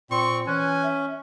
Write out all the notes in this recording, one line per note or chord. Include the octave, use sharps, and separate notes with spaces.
A#2 C4 C6 C#6
E3 C#4 G#5 F#6
E5